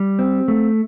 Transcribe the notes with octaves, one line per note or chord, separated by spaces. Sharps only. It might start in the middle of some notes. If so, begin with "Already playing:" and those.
Already playing: G3
C4
A3